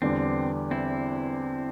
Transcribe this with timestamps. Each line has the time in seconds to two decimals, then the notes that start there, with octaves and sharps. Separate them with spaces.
0.02 E2 D3 G3 B3 C4 D4
0.71 C4 E4